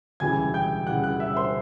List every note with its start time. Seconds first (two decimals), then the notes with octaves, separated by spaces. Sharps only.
0.20 E1 D2 C#3 E3 G3 G#5 G#6
0.54 G5 G6
0.87 E1 D2 C#3 E3 G3 F#5 F#6
1.03 F#5 F#6
1.20 E5 E6
1.36 C5 C6